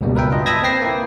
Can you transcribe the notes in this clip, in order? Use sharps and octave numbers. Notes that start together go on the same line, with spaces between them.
C#2 G2 B2 G3 A#3
A#4 B4 E5 G5
D4 F4 D#5
A5 B5 D#6 E6 G#6 A#6
A#3 C4 B4 G5 A#6 C7
A#3 E4